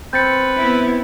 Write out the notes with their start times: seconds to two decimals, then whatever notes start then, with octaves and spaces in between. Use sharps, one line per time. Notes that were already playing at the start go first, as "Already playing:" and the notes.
0.13 C4 B4 G6 A6 C#7
0.57 B3 E4